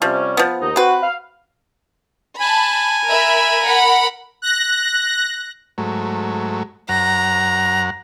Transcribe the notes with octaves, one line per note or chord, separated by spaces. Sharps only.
C3 F3 G3 C#4
F3 B3
D#2 D#4
C4 F#4 B4
F5
G#5 A5 B5
A#4 E5 B5
A#4 F#5 B5
F#6 A#6
G#2 F#3 A3
F#2 F#5 A#5